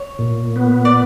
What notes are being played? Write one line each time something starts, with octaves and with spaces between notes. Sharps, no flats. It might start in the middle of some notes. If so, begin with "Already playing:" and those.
Already playing: C#5
A#2
B3
D5